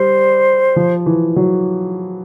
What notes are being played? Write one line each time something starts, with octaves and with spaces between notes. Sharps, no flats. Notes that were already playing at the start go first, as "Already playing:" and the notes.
Already playing: G3 C5
F3
E3
F#3